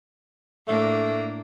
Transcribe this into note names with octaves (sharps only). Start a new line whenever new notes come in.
A2 A3 A#3 D4